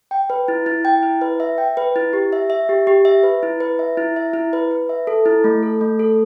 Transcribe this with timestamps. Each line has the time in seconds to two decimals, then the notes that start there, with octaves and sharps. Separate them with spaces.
0.11 G5
0.30 B4
0.48 E4
0.66 E4
0.85 G5
1.03 E4
1.21 B4
1.40 E5
1.58 G5
1.77 B4
1.96 E4
2.13 G4
2.33 E5
2.50 E5
2.69 G4
2.87 G4
3.05 E5
3.23 B4
3.43 E4
3.60 B4
3.79 E5
3.97 E4
4.16 E5
4.34 E4
4.53 B4
4.71 B4
4.89 E5
5.07 A4
5.26 E4
5.44 A3
5.63 A4
5.81 A3
5.99 A4